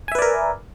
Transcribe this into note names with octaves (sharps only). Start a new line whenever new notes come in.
A#4 B4 D5 E5 G#5